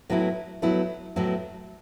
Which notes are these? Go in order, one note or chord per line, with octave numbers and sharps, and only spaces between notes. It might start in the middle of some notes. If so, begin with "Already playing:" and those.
A2 F#3 B3 E4
A2 F#3 B3 E4
A2 F#3 B3 E4